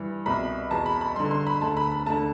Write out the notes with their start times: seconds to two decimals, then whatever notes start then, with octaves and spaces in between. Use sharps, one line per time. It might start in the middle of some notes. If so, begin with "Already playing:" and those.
Already playing: G2 E3
0.26 C2 B2 B5
0.71 E2 B2 A5
0.86 B5
1.01 B5
1.16 G2 D3 C6
1.31 C6
1.47 B5
1.61 D2 D3 A5
1.77 B5
1.92 B5
2.06 D2 D3 A5